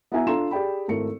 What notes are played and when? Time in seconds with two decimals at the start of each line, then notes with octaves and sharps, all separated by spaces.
0.12 B3 E4 F#4 E5 G#5 A#5
0.27 D4 F4 A4 A#5 C6 E7
0.51 G4 G#4 D5 G5 B5
0.88 G#1 A3 E4 A#4 C#7